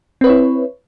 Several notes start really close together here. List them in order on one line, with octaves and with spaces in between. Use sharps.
C4 B4 C#5 E4